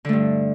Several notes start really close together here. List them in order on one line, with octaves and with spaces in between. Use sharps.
D3 A3 G2